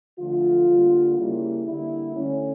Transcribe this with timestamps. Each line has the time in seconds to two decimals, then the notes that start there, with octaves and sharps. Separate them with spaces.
0.18 D3 F3 A3 F4
0.67 D3 G3 A#3
1.16 C#3 G3 A#3 E4
1.65 D3 G3 A#3 E4
2.14 D3 A3 C#4